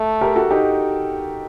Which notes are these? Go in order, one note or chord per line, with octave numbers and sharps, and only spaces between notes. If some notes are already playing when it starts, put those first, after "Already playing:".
Already playing: A3
G4 A#4
F#4 A4
D#4 G4